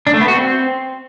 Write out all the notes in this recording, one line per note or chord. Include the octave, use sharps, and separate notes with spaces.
D4
A3
B3
F#4
C4